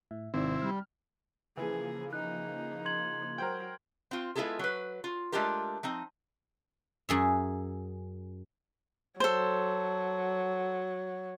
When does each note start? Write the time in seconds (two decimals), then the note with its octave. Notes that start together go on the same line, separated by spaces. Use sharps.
0.11 A2 E5
0.34 G#1 C3 D#3 C4 E4 D5
0.62 G3 F6
1.57 C#3 E3 F3 A#3 G#4
2.13 D#4 G#4 F#6
2.85 C6 G#6 F#7
3.38 F#3 A#4 C5 G5
4.11 C4 F4
4.36 G#3 B3 E4 F4 G#4 A4
4.59 F#3 B4
5.04 F4
5.32 G#3 A3 D4 F4 G4 A#4
5.83 F3 C4 D#4
7.09 F#2 G#4 E5
9.20 F#3 A4 C5